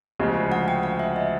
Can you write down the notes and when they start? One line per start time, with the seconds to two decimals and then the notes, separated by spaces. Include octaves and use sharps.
0.19 D2 C#3 F3 G#3
0.52 F#5
0.68 G5
0.83 F#5
0.99 E5
1.16 D#5